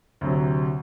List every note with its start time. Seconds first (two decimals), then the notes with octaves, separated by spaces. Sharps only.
0.21 D2 C3 F#3